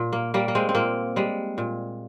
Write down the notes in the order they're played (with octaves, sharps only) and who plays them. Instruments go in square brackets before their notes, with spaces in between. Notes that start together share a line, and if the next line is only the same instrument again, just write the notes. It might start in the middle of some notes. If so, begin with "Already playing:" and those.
Already playing: [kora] A#2
A#3
G3 A#3
A#3
G#3 C4
C4
A#2 A#3
G3 G#3
A#2